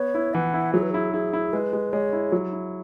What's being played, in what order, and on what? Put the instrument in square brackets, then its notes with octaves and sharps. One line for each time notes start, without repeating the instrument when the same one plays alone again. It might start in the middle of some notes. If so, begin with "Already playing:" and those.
Already playing: [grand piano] B3 [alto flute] C#5
[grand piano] E4
[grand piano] E3 [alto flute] F#5
[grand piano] E4
[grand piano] F#3 [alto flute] G#4
[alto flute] B4
[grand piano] E4 [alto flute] G#4
[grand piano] E4 [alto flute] G#4
[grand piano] E4
[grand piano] G#3 [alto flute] B4
[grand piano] G#3
[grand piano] G#3 [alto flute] C#5
[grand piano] E4
F#3
E4